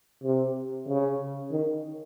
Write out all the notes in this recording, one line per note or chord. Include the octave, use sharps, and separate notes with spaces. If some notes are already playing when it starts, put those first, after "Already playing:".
C3
C#3
D#3